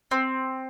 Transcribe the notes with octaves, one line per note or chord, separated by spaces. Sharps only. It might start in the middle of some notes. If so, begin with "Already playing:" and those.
C4